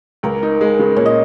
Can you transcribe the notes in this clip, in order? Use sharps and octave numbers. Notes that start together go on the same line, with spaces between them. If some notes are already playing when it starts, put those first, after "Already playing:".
C#2 A#4
D#4
G#3
C#3
A#2 C#5
D#5